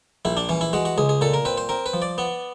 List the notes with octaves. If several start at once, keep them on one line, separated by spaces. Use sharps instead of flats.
A#1 E4
D4
E3 C#4
E4
G#3 F#4
F#4
C#2 G#4
G#4
A#2 A4
A#4
C4 B4
C5
C4 A#4
B4
F3
D5
B3